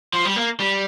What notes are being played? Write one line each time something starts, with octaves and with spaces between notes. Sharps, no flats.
F3
G3
A#3
G3